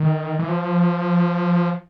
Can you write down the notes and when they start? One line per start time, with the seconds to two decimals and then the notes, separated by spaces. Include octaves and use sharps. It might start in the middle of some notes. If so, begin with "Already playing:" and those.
Already playing: D#3
0.39 E3
0.48 F3